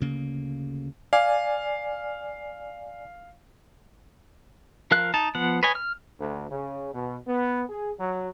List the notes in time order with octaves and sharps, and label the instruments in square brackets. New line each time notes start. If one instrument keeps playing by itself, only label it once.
[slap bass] D2 C#3 A#3
[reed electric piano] D5 G#5 [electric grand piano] F5
[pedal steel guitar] F3 A#4 F5 F#6
D#4 A5
F3 B3 F#5
B4 C#5 D#5 G#5
F6
[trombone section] D2
C#3
B2
B3
G#4
F#3